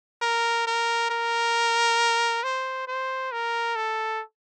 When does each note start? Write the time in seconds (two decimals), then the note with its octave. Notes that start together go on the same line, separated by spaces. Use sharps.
0.22 A#4
0.67 A#4
1.10 A#4
2.44 C5
2.88 C5
3.32 A#4
3.76 A4